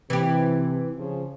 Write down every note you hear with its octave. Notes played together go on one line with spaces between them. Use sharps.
C3 E3 G4
C#3 F3